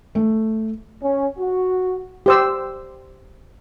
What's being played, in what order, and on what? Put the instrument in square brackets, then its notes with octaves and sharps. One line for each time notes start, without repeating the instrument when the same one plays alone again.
[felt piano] A3
[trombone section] C#4
F#4
[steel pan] G4 C5 E6